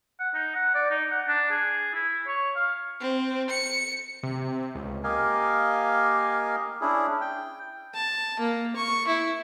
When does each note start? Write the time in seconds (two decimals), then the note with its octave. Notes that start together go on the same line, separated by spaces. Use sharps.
0.20 F#5
0.34 D#4
0.55 F#5
0.75 D5
0.91 D#4
1.11 F#5
1.28 D4
1.51 G#4
1.94 E4
2.27 C#5
2.56 F5
3.00 C4
3.50 C#7
4.23 C3
4.75 C#2
5.03 A#3 G4 A#4 D#5 F5 G#5
6.81 C#4 D4 E4 G#4
7.21 G5
7.94 A5
8.40 A#3
8.76 C#6
9.08 E4